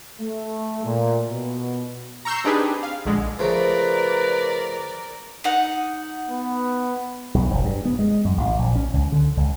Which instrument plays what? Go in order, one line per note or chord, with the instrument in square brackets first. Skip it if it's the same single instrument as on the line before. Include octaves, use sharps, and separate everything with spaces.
[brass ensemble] A3
A#2
B2
[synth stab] A#5 C#6 E6 G6 C7
C4 D4 D#4 G4 G#4 B4
F5
A#1 D3 G#3
[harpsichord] C#3 F3 A3 [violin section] A#4 D5 [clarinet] B4
[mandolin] D#4 F#5
[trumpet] B3
[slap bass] B1
F1
G2
B3
G#3
F#2
A1
A#1
C#4
C#2
D3
C#2